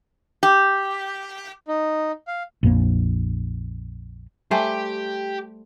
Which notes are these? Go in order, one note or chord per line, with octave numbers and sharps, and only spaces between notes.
G4
D#4
F5
A#1 F2 A#3
G3 A3 G4 C5 E5 G#5 A5